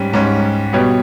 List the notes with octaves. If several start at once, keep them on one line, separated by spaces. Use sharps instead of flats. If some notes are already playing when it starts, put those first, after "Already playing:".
Already playing: G#2 G3 C#4
G#2 G3 C#4
B2 G3 B3 G4 C#5